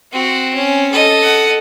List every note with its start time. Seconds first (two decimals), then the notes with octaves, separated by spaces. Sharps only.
0.13 C4 F#4
0.54 C#4
0.91 A4 D#5
1.22 F#5